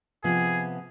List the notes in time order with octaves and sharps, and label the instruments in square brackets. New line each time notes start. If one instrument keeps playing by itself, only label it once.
[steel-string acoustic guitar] C3 F3 B3 [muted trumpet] G#4